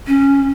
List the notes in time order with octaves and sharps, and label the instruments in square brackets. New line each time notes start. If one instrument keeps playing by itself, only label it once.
[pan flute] C#4